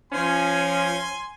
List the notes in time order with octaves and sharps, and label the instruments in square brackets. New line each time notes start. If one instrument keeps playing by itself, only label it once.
[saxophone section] F3 C#4 [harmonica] G#5 C6